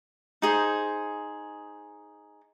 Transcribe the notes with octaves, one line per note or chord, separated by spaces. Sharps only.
D#4 G#4 C5